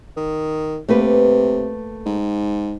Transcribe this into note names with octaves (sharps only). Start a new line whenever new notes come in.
D#3
C3 A3 A#3 B4
G#2